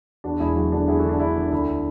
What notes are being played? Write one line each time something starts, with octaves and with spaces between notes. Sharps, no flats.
E2 D4 F#4
E1 E4 G#4
F#3 E4 G#4
D3 D4 F#4
E2 E4 G#4
F#4 A4
D3
D4
D3 E4
D3
D2 E4